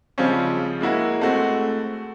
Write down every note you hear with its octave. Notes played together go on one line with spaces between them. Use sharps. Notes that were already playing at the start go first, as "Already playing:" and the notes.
C#3 F3 G3 G#3 C4 C#4
G#3 A#3 E4 F#4
G#3 A3 C4 F#4